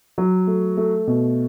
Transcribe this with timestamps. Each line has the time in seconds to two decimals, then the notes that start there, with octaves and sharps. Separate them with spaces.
0.18 F#3
0.47 A3
0.77 A3
1.07 B2